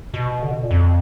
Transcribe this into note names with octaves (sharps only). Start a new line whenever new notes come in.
B2
D3
B2
A#2
F2